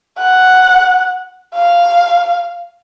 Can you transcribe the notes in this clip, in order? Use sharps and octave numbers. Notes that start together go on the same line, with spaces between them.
F#5
F5